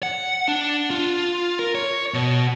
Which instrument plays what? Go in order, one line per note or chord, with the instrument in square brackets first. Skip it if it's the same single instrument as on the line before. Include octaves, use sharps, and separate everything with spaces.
[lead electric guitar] F#5
D4
F4
A#4
C#5
B2